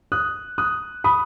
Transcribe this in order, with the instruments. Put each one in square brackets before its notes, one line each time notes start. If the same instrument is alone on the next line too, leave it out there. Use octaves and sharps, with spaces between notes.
[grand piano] D#6 F#6
D#6 F#6
B5 D#6